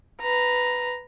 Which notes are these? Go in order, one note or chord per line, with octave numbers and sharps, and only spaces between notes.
B4 A#5